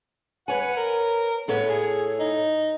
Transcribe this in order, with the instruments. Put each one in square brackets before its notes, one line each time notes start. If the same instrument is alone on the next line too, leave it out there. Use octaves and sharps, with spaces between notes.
[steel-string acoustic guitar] B4 C#5 G#5 [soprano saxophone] F#5
[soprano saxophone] A#4
[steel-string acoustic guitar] A2 A4 C#5 [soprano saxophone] B3
[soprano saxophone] G#4
D#4